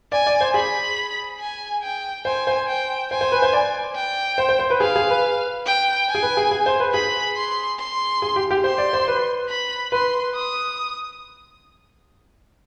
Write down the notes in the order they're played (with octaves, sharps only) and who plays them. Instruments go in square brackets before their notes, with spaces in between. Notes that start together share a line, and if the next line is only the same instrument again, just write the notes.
[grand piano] D5 [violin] G#5
[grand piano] D5
C5
[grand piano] G#4 [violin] B5
[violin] G#5
G5
[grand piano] C5 [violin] G#5
[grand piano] C5
[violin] G5
[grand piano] C5 [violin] G#5
[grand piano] C5
B4
C5
D5
[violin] G5
[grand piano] C5
C5
C5
B4
[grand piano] G#4 [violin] F5
[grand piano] G#4
B4
[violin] G5
G#5
[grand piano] G#4
B4
G#4
G#4
C5
B4
[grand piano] G#4 [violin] B5
[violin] C6
C6
[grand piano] G#4
G4
G4
[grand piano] C5 [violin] C6
[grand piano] D5
C5
B4
[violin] B5
[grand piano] B4 [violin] C6
[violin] D#6